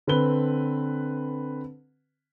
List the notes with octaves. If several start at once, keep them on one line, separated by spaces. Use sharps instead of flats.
D3 C4 B4 G7